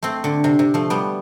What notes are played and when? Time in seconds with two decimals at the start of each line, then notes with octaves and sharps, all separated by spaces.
0.03 A3 C4
0.24 D3
0.44 C3
0.59 C3
0.74 F3 A3
0.90 G3 B3